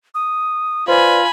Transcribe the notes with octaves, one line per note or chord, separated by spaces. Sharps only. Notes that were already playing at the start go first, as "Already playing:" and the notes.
D#6
F4 B4 C5 D5 G#5 B5